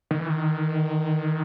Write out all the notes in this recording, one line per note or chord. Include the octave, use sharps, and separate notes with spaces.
D#3
E3
D#3